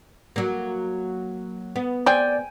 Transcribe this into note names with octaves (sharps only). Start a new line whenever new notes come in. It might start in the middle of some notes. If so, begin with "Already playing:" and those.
F#3 A#3
B3
C4 G#4 D5 G5 G#5